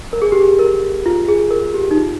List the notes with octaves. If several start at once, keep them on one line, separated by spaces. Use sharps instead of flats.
A#4
G#4
G4
G#4
A#4
F4
G#4
A#4
G4
D#4
F4